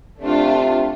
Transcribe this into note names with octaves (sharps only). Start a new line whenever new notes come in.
C3 A3 D4 F4